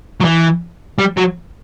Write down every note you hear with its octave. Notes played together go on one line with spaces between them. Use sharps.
F#3
E3
G3
F#3